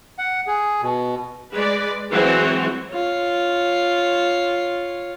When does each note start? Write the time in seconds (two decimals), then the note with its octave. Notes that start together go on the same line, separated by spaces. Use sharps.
0.18 F#5
0.47 G#4
0.82 B2
1.52 G#3 B4 D5
2.11 E3 F#3 G#3 C4 F#4
2.91 F4 C#5